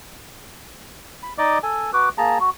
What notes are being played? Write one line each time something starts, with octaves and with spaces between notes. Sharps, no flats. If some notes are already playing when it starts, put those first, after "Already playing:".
B5
D#4 D5 D#5 D6
A4 G#5
F#4 B4 D6
A#3 G#4 A5 A#5
F#4